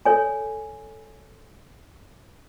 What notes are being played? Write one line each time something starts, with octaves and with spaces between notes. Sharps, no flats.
A4 C#5 G#5